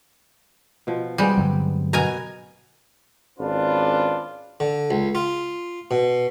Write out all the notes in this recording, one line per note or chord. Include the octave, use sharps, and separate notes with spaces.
B2 F3
G3 G#3 B3 C4 G4
G2 D3 F#3
B2 B3 A#4 G#5 A#5
G#1 C#4 D4 F4 B4
D3
C#2
F4
B2